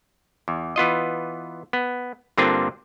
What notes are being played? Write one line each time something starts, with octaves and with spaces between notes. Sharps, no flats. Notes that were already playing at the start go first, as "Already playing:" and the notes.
E2
E3 B3 F4 D#5
B3
G2 D3 A#3 C4 D4 F4